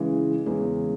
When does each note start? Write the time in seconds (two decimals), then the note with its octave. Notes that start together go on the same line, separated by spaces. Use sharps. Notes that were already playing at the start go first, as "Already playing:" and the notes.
Already playing: C#3 E3 G#3
0.46 E2 C#3 E3 G#3 C#4